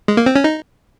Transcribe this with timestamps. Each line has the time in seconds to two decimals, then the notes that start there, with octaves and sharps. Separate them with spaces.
0.08 G#3
0.17 A#3
0.26 C4
0.36 C#4
0.44 D#4